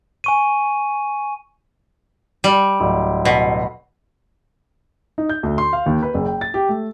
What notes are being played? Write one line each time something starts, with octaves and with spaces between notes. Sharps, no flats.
G#5 C#6 D#7
G3
D1
B2
D#4
G6
D2
C6
F5
D#2
B4
F#1
G5
A6
G4
A3